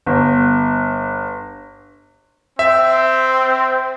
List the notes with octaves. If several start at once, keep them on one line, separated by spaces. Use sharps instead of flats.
G1
C4 E5